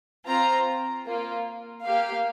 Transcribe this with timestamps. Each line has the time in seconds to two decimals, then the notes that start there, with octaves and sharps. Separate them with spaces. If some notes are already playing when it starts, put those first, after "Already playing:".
0.26 C4 F4 A#5
1.06 A#3 F4
1.84 A#3 G4 F5